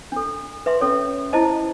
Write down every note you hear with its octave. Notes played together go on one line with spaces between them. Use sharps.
D4 A4
B4 E5 C6
C#4 A4 C#5
E4 C5 D#5 A5